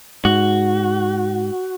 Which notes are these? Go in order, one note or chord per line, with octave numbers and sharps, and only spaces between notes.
G#2 F#4